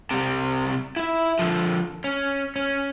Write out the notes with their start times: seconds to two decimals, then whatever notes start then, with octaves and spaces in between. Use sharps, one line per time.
0.11 C3 G3
0.96 E4 E5
1.39 D3 F3
2.04 C#4
2.56 C#4